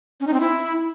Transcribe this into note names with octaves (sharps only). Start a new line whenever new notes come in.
C#4
D#4
C4
E4